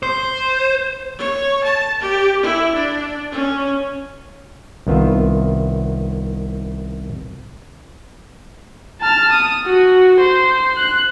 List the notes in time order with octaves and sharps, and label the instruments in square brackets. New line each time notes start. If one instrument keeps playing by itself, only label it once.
[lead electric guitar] C5
[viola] C#5
A5
G4
E4
D4
C#4
[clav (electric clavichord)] C2 D#3 B3 F4 E5
[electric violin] A5 F6
D#6
F#4
C5
F#6